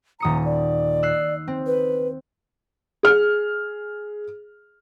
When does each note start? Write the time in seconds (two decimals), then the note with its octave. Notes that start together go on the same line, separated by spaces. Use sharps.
0.20 D#1 A#5 D#6 C#7
0.45 D5
1.03 E6 F#6 C7
1.47 C4
1.67 B4
3.03 G#4 F6